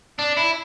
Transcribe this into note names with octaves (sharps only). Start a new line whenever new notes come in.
D4
E4